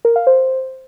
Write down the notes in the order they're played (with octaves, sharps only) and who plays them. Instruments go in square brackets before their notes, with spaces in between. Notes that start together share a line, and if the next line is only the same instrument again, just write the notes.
[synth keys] A#4
F5
C5